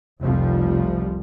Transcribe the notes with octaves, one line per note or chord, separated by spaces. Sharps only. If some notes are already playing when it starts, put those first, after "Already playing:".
F1 C2 F2 F3 G3